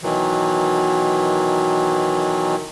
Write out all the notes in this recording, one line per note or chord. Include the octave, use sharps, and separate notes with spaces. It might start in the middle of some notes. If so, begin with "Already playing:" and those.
B2 D#3 E3 F#3